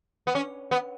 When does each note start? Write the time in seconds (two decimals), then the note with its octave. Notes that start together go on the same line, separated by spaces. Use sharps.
0.27 B3
0.35 C#4
0.71 B3